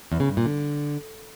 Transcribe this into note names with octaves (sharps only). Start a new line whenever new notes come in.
E2
C#3
G2
A#2
D3